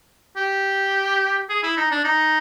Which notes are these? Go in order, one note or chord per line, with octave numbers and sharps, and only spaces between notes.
G4
G#4
E4
D#4
D4
D#4